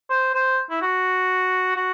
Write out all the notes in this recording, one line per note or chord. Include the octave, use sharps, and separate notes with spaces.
C5
C5
E4
F#4
F#4